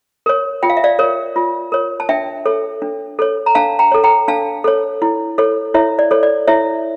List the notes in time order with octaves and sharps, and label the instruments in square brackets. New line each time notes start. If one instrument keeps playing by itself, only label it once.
[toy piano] A#4 C#5
F4 G5
F5
E5
D5 F5
A#4 C#5
F4
A#4 C#5
A5
D4 E5 G5
A4 C#5
D4
A4 C#5
A#5
D4 F5 A5
G5 A#5
A4 C#5
G5 A#5
D4 F5 A5
A4 C#5
E4
A4 C#5
E4 C#5 E5
D5
A4 C#5
D5
E4 C#5 E5